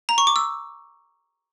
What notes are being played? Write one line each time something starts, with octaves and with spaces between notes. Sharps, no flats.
A#5
C#6
D6
E6